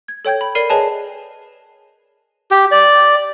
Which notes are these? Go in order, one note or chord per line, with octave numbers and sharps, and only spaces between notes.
G#6
A4 C#5 G5 G6 G#6
B5
A#4 D5 B5 C7 D#7
G#4 B4 C#5 D#5 G#5 A5
G4
D5